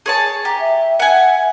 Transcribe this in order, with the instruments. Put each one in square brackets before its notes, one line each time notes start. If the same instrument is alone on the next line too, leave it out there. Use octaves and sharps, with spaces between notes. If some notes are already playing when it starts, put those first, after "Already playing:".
[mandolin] G#4 C#5 A5
[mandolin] G4 [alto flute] A#5
[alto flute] E5
[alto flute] E5 [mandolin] F#5 G#5